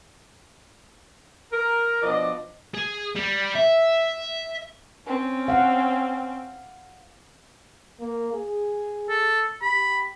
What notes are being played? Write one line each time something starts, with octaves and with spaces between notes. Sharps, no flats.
A#4
B2 F3 D4 D5 D#5
G#4
G3
E5
C4 C#4
F5 F#5
A#3
G#4
A4
G4 B5